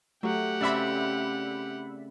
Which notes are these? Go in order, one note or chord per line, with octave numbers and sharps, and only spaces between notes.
F#3 A3 G4 F#5
C#3 C4 D5 E5 B5